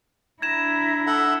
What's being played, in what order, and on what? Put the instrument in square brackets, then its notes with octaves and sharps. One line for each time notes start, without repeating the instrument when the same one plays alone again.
[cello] D4 E4 [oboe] A#5 [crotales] G#6 E7
[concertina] A4 E5 F#5